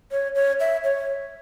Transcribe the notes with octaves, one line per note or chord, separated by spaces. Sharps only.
C#5
C#5
E5
C#5